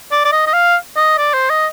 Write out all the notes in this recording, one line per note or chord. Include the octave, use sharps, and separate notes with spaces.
D5
D5
D#5
D#5
F5
D#5
D5
C5
D#5